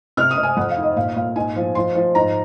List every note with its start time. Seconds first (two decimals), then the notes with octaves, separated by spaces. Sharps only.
0.17 C3 F6
0.31 D#6
0.37 C3
0.43 G#5
0.57 F2 F#5
0.70 F5
0.77 D#3
0.83 D#5
0.96 A#2 F5
1.16 A#2 F5
1.35 G#2 G#5
1.56 F3
1.75 F3 C6
1.95 F3
2.15 G#2 A#5